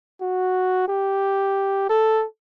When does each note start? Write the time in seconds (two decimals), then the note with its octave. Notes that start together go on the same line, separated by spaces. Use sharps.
0.21 F#4
0.88 G4
1.89 A4